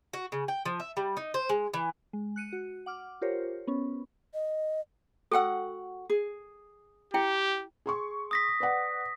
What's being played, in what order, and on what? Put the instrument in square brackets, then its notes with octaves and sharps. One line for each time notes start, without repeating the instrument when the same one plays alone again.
[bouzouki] F#4
C#3
G5
F3
E5
G3
D#4
C5
G#3
E3
[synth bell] G#3
F#6 C#7 D#7
F#4
F#5 D6 F6
F4 G4 A#4 C5 C#5
B3 C#4
[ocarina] D#5
[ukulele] F#4 F#5 [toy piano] A4 G5 E6
[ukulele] G#4
[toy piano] E4 G5 [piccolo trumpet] G4
[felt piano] G#4 C6 C#6
[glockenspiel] D#6 A#6 B6
[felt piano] B4 D5 F#5